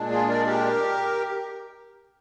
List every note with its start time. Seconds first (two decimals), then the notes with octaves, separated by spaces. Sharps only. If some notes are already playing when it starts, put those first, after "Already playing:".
Already playing: A#2 G#3 D4
0.11 F4 G#4
0.29 A#4 D5
0.47 G4 A#4